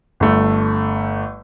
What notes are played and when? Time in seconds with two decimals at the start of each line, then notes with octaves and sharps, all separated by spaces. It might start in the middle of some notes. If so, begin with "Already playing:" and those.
0.20 G1 A3